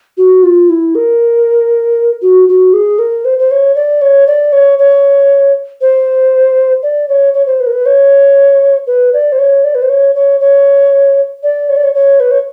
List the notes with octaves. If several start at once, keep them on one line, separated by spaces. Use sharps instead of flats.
F#4
F4
E4
A#4
F#4
F#4
G#4
A#4
C5
C5
C#5
D5
C#5
D5
C#5
C#5
C5
D5
C#5
C#5
C5
B4
A#4
B4
C#5
B4
D5
C5
C#5
D5
B4
C5
C#5
C#5
C#5
D5
C#5
D5
C#5
C#5
B4
C#5